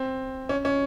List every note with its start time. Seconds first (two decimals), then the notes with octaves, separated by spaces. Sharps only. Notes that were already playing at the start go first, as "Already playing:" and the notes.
Already playing: C4
0.49 C#4
0.65 C#4